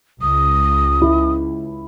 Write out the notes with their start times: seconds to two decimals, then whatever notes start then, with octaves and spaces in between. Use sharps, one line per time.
0.22 C#2 D#6
1.02 E4